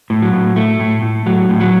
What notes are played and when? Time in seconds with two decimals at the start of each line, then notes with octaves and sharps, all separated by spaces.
0.10 A2
0.22 F#3
0.33 A2
0.56 A2 A3
0.80 A2
1.02 A2
1.26 A2 F#3
1.49 A2
1.60 F#3